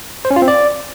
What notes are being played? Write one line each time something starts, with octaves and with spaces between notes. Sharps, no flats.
C5
C#4
F4
C4
D5